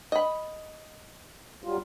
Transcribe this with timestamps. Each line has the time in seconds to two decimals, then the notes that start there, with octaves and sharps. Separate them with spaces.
0.12 D#5 B5
1.64 F#3 G3 F4